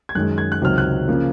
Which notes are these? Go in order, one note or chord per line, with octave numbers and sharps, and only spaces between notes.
G#6
F#2 D#3 G#3 F#6
G#6
F#6
C#2 C3 D#3 F#3 C4 F6
F#6
C#3 F3 A#3